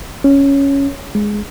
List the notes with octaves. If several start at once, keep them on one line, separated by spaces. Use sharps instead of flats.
C#4
G#3